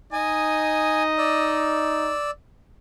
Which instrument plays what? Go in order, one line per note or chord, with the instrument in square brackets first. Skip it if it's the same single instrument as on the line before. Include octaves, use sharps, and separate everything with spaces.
[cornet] D#4 [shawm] D#5 [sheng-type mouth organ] G#5
[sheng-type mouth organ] D5 E6